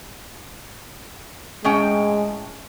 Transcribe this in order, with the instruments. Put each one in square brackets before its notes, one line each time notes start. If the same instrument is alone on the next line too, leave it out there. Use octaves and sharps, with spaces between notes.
[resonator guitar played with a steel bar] A2 C#4 G5 [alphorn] G#3